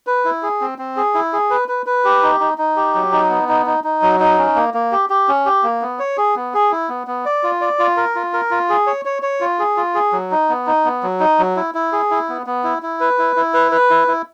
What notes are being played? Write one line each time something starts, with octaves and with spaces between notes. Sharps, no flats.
B4
E4
G#4
C4
C4
G#4
E4
G#4
B4
B4
B4
G4
D#4
D#4
D#4
G4
F#3
D#4
B3
D#4
D#4
D#4
F#3
D#4
C#4
A#3
A#3
G4
G4
C#4
G4
A#3
B3
C#5
G#4
B3
G#4
E4
B3
B3
D5
F4
D5
F4
A#4
F4
A#4
F4
G#4
C#5
C#5
C#5
F4
G#4
F4
G#4
F#3
D#4
B3
D#4
B3
F#3
D#4
F#3
E4
E4
G#4
E4
B3
B3
E4
E4
B4
E4
E4
B4
B4
E4
E4